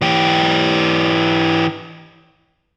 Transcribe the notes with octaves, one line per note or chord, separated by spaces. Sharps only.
E3 G4